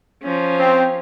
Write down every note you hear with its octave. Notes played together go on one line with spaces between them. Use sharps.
F3 C#4
C4